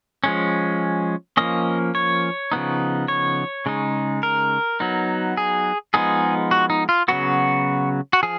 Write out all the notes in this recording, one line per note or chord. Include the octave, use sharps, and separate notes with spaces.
F3 G#3 C#4
F3 A#3 C#4 D#5
C#5
C#3 F3 B3 D#4
C#5
C#3 G#3 D#4
A#4
F#3 B3 D#4
G#4
F3 G#3 B3 D#4 G#4
F#4
D#4
F4
C#3 F#3 B3 F#4
F#4
F3 G#4